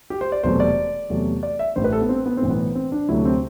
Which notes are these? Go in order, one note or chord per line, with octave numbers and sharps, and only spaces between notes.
G4
C5
D5
E1 E2 C3 F#3 A3 C5
D5
E2 C3 F#3 A3
D5
E5
A1 A2 G3 C5
B4
A4
B3
C4
B3
C4
B1 A2 E3
B3
C4
D4
D2 C3 F#3 A3 E4
C4